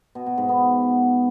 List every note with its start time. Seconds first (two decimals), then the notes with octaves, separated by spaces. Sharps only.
0.15 B2
0.26 B2
0.38 G#2
0.49 B3